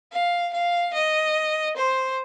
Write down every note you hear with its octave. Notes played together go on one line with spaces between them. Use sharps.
F5
F5
D#5
C5